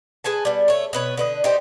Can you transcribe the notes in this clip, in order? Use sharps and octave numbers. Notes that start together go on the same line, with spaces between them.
G#4 B4 G#5 A5
G3 B3
A3 C#5
B2 B4 C#5
D3 B4 D#5
D#4 G4 C5